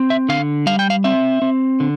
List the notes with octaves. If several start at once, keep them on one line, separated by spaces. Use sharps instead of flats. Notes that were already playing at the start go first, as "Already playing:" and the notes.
Already playing: C4
E5
D3 F5
G3 F5
G5
F5
C4 E5
C4
D3